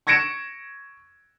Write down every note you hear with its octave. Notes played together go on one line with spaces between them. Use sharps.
C#6 G#6 A#6 C#7 D7 E7